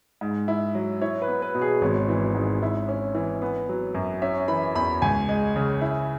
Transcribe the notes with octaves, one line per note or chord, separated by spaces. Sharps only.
G#2
E4
F#3
E4 C#5
B4
B3
B4
B2
G#4
G#1 C#5
E3
G#2
E4
C#4
E3
B3
F#3
F#2
C#4 E5
E3 B5
E2 B5
C#2 G#5
G#3
C#3
E4